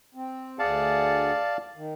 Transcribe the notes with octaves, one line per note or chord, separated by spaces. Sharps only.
C4
D2 G#4 D5 F5 F#5 A5
D#3